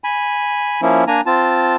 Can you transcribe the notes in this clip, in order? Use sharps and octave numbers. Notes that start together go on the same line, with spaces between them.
G#5 B5
F3 A#3 C#4 E4
A#3 D4 G#5 A#5
C4 F4 A5